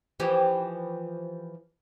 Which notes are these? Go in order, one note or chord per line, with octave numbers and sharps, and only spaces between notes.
E3 F3 G4